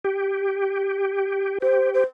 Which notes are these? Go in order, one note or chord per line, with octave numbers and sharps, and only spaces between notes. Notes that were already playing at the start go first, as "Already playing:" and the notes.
G4
G4 C5
C5